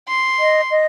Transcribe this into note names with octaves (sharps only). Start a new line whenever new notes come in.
C6
D#5
D#5